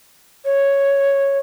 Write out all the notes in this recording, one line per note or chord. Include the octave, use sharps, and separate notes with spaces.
C#5